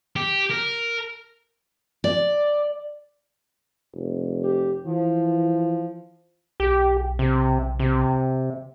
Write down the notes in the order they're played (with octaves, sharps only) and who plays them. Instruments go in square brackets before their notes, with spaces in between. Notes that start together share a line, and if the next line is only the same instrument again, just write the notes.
[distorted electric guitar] G4
A#4
[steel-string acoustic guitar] D5
[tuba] F1
[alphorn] G4
[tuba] E3 [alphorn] F3
[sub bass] B1 [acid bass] G4
[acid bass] C3
C3